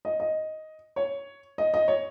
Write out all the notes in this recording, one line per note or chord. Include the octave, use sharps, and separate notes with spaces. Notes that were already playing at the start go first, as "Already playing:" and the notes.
D#5
D#5
C#5
D#5
D#5
C#5